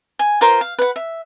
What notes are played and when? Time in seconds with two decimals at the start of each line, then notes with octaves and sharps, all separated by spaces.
0.19 G#5
0.41 F4 A#4 C5 C6
0.61 F5
0.79 B4 F#5
0.96 E5